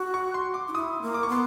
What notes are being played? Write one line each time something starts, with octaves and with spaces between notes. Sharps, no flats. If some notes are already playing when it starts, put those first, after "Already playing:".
Already playing: F#4 C#6
C#6
C6
D6
D#4
E4 D#6
A#3
D6
C#6
B3 C6